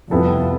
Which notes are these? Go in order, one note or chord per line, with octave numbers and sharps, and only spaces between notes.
F2 C3 G3 B3 E4 A4